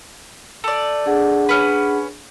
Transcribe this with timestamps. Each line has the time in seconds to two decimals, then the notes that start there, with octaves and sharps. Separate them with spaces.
0.64 A3 D5
1.06 D4 G#4 F#5
1.49 C#4 B4